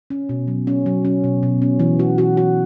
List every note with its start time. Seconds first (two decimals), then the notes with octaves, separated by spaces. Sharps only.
0.10 C#4
0.29 B2
0.48 F#3
0.67 C#4
0.86 F#3
1.05 C#4
1.24 B2
1.43 B2
1.62 C#4
1.79 E3
1.99 F#4
2.18 F#4
2.37 F#4